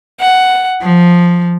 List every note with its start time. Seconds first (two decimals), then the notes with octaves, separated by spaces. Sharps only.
0.21 F#5
0.82 F3